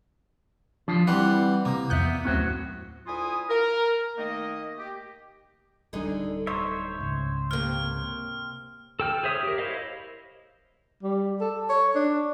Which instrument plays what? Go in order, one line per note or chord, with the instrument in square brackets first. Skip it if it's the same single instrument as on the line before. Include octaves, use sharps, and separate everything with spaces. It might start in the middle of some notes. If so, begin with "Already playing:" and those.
[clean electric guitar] F3 F4 [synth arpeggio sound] D4
[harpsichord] E3 G3 C4 [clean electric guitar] F#5
[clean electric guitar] C3 [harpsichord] A#3
[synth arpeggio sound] F2 F#6 G6 [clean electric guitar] B3 E5
[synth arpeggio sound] D#2 C4 C#4 [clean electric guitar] A2 F#3 F#4
[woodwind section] D2 E4 F4 G#5 D#6
A#4
D#3 A3 A#3 D#5
G4
[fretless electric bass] D1 G3 D4 [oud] D3 D#4 G#4
[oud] D#4 [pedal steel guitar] C5 C#5 E5
[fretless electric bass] C#2 G#2 C#3
[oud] C3 A#3 [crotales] F6
[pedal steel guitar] A4 G5 F6
G#4 C5 C#5 E5 D#6
G4 A#4
E4 C5 C#5 D#5 F5
[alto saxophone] G3
A4
C#5
D4